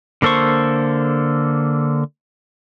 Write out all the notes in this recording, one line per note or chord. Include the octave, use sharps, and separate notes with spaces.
D3 A#3 A4 C5 C#6